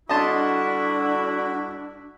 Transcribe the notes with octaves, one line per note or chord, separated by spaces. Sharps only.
D3 G3 D4 E4 F#4 D#5 A5 C6